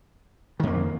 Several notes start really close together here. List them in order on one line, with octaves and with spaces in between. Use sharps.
D#3 F2 A#3